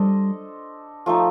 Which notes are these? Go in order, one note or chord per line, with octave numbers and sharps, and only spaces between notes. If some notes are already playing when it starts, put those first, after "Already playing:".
Already playing: G3 D4 A4 C5 D#5
F3 A3 D#4